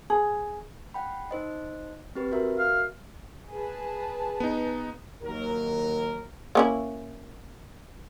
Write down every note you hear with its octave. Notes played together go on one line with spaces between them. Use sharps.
G#4
F#5 G5 B5
D#4 C5 D#5
C4 G4 B4
F#4 A#4 E5
F5
G#4 B4 A5
B3 D#4
D#2 F#3 A#4
A#3 C#4 E4